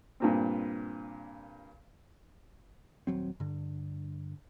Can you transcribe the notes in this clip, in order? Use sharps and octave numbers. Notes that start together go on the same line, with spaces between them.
G2 A#2 C4
D#1 G#1 F#3 C4
G2 D3